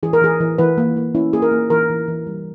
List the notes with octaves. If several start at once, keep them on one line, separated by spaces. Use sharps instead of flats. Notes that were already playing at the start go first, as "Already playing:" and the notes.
E3 G#4
A#4
E3 G#4
E3
E3 B4
A#3
A#3
C#4 E4
A#3 G#4
A#4
A#3
E3 A#4
E3
E3
G3